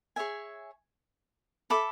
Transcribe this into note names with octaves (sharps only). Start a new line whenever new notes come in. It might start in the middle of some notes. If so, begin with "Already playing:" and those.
G#4 C#5 E5 G#5
A4 E5 B5 D6